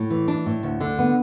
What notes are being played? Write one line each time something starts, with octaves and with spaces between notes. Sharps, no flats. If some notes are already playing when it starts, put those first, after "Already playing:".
Already playing: A2
E3
D4
A2
D2
D3
B3